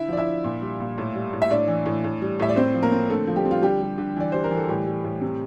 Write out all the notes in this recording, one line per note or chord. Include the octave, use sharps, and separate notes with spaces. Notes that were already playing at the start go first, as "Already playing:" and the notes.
Already playing: D3 E4 E5
F3 D5
E4 E5
D4
A#2
G3
A#2
A2
G3
A2
E5
A2 D4 D5
E3
A2
A2
G3
A2 E5
D5
A2 C4 C5
F3
A#3 A#4
C4
D3 A3 A4
F3
G3 G4
C4
F4
D3 G3 G4
G3
D3
E3 D5
G3 C5
A#4
E3
A4
A2 G3 G4
G3
A2
C3